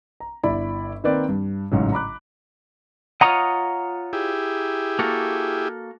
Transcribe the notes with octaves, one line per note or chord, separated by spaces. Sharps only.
A#5
G1 E4 D5 B5
D#3 A#3 C4 B4 D5
G2
A1 G#2 C#3 F#3
A#5 B5 D6 F#6
F4 C#5 D#5 F#5 A#5 D#6
E4 G4 G#4
A#3 F#4 A4